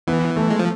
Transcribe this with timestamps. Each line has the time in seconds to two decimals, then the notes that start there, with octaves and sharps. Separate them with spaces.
0.07 E3 B3
0.36 A3
0.50 G#3
0.59 F3